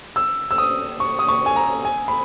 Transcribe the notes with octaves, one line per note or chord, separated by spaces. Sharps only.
E6
E6
D#6
C#6
D#6
C#6
G#5
A#5
G#5
B5